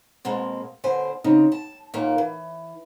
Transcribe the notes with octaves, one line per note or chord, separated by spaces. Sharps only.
B2 G#3 A#3 C4
B2 D3 C5 G#5
C#3 C4 D#4
A5
D#2 A#2 A#3 A#4
E3